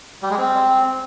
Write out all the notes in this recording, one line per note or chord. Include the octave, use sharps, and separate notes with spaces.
G3
G#3
C4